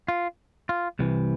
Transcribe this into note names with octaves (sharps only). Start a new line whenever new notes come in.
F4
F4
C2 C3 E3